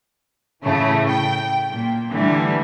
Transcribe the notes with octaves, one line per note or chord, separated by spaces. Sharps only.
A2 C#3 E3 A3
G5
A#2
D3 E3 G3 A3